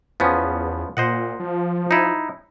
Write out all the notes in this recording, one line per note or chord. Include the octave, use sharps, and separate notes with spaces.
E2 F3 B3 C#4
A#2 C5 D#5 F#5
F3
D#4 E4